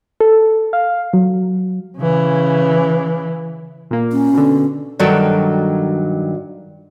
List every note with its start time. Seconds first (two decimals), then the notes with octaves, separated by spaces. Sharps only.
0.20 A4
0.73 F5
1.13 F#3
1.98 C#3 E3
3.91 A#2 A#3
4.12 C#4
4.33 B2 D3
4.99 G2 D#3 F#3 F#4 A4 D5